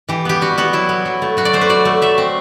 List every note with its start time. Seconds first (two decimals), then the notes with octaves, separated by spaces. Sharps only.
0.09 E3 G4
0.25 B3 G4
0.41 G3 F#4
0.58 B3 F#4
0.73 F#3 E4
0.89 B3
1.05 F#3
1.22 A3
1.37 F#3 F#4
1.45 D5
1.53 A3 C5
1.61 B4
1.69 F#3 D5
1.85 A3
2.02 F#3 E5
2.18 C4